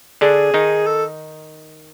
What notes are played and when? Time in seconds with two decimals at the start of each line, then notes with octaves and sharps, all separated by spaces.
0.21 D3 D4 G#4
0.54 D#3 D#4
0.87 A4